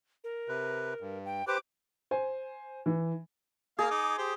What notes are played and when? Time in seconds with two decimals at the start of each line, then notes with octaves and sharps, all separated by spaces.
0.24 A#4
0.48 C3 B4
1.01 G2
1.25 G5
1.47 G4 B4 C5 D6
2.11 C5 G#5
2.86 E3
3.79 A#3 G#4 F5 D#6
3.91 D#4 D6
4.18 G4 C5